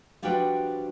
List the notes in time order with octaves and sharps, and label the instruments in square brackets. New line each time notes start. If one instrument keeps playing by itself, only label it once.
[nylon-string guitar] F3 G3 D4 F#4 B4 G5